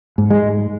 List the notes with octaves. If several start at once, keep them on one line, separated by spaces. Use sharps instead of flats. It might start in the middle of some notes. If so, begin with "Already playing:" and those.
G#2
G#3